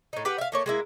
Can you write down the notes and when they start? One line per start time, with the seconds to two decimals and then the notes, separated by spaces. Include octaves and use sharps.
0.13 A2 D#4
0.25 G4 B4 F#5
0.38 E5 F5
0.52 A3 A#3 C#5
0.66 G#3 A#3 E4